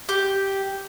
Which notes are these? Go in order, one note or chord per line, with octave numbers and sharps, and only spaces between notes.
G4